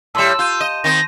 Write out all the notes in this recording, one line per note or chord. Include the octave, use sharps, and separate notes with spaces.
A2 G3 A5 C6 E6 E7
F4 C6 G6 D#7
D#5 D#7 E7
D#3 C4 A#6